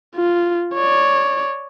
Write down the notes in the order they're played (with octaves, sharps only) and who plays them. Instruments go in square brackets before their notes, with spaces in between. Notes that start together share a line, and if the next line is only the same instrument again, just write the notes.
[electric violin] F4
C#5 D5